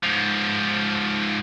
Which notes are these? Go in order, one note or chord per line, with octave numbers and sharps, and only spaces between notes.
G#2 F3